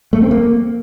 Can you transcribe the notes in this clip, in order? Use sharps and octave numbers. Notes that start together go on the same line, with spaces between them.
A3
C4
A#3